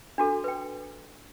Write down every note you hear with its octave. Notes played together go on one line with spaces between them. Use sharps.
D4 F#4 A4
B4 G5